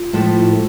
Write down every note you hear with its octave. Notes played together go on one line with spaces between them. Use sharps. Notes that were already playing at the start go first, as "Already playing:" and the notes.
Already playing: F4
A2 F3 A3
A4